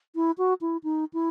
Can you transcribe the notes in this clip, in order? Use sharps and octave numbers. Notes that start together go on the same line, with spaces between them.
E4
F#4
E4
D#4
E4